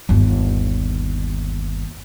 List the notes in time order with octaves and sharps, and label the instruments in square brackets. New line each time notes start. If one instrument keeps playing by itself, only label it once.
[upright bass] G1 D#2